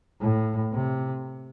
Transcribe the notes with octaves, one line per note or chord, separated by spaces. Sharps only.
A2
C3